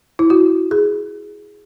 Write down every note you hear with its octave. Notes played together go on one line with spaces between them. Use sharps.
E4
F#4
G#4